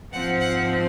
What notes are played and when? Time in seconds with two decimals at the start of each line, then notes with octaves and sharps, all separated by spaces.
0.13 G#2 F3 C4 F#5
0.40 F#5